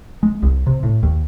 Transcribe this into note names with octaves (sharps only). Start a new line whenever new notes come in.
G#3
C2
C3
A2
D#2